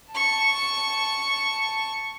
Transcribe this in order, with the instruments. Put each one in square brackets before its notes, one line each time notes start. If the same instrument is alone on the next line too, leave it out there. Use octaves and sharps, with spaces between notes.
[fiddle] A5 C#6